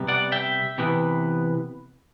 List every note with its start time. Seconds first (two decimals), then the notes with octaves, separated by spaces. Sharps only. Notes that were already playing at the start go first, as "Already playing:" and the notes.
Already playing: C3 G3 B3
0.08 D5 F#5
0.32 E5 G5
0.78 C3 E3 B3